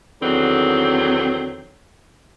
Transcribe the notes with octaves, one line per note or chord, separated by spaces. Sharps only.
E2 D3 D#3 F#3 C4